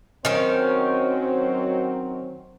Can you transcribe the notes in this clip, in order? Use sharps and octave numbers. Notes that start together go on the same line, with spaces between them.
D#3 F#3 C4 C#4 C5